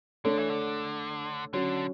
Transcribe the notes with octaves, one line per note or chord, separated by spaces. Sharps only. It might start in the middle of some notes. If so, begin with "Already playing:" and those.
D3 A3 D4 A4 C#5
E3
D3
D3 F#3 C#4 F#4